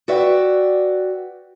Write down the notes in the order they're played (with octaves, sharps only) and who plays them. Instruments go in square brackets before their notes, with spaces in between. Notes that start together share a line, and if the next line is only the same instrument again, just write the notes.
[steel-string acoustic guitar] F#4 B4 D5 E5 F#5 G5